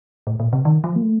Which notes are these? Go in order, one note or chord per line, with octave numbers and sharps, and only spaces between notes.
A2
A#2
C3
D#3
F3
A#3
A3